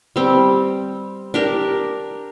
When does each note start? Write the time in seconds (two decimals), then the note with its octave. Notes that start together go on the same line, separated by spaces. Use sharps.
0.16 G3 C4
1.34 D4 G4 A#4